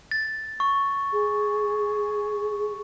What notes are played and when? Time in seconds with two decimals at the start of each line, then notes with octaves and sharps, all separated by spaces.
0.11 A6
0.60 C#6
1.13 G#4